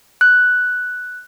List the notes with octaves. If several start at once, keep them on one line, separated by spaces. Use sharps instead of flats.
F#6